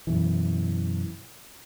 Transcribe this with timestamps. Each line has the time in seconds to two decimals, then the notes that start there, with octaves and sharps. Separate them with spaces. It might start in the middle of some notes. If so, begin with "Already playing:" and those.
0.07 F#2 B2 E3